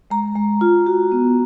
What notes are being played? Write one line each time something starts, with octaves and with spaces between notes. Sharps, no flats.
G#3 A#5
G#3
F4
F#4
B3